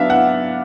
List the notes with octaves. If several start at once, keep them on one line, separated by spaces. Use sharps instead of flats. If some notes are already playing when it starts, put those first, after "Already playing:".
Already playing: F#3 B3 D4 E5 F5
F#5